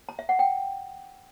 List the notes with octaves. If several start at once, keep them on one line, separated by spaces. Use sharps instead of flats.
A#5
E5
F#5
G5